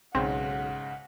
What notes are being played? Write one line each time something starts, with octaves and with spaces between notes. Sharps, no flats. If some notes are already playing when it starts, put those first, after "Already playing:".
B1 G#2 C#3 C4 F#5